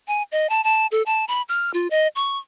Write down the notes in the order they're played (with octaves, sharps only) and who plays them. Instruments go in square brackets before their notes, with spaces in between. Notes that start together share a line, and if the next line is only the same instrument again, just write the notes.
[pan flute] G#5
D#5
A5
A5
A4
A5
B5
F6
F4
D#5
C#6